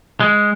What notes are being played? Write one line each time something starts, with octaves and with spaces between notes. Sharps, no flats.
G#3